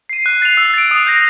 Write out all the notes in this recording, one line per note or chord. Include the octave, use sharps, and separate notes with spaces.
C7 D#7
F#6
A6 C7 F7
E6
A6 D7
D#6
G6 A#6